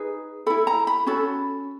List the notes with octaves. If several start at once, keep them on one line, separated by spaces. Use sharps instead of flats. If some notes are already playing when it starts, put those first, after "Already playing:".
Already playing: D#4 G#4 B4
E4 A4 B5
A#5
B5
C#4 F#4 A4 B5